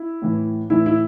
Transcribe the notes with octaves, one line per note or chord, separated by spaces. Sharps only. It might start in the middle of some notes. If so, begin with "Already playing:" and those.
Already playing: E4
A2 E3
A2 E3 E4
E4